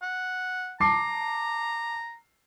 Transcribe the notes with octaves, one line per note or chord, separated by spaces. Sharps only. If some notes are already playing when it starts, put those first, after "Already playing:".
F#5
A5 A#5 D6 C7